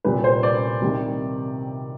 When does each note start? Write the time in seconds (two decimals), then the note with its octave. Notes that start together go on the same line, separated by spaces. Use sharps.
0.05 C2 A#2 G3 B4
0.24 C5
0.43 D5
0.82 C2 C3 D#3 G3